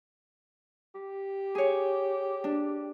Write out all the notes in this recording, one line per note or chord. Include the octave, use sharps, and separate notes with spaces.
G4
G#4 C#5
D4